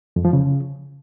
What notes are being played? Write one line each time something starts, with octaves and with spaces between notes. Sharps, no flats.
F2
F3
C#3